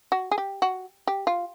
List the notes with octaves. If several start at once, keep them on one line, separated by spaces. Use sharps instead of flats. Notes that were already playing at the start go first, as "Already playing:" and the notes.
F#4
G#4
G4
F#4
G4
F4